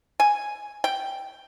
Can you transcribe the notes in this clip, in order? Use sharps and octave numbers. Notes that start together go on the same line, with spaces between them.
G#5
G5